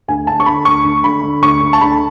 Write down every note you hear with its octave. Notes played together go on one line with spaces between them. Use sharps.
D2 G#5
D3 A5
C#6
D3 B5
D2 C#6
D2
D3 B5
D3
D2 C#6
D2
A5
D3 B5